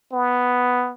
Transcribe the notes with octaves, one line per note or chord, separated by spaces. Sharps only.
B3